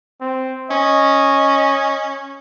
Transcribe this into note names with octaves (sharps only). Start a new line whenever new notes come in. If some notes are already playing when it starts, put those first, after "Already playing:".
C4
C#4 D#5